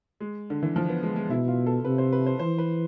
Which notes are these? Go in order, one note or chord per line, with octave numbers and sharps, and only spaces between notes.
G#3
D3
E3
F3
B3
G#3
G#3
B2 E4
F4
A4
C3 B4
C5
B4
C5
E3 C5
B4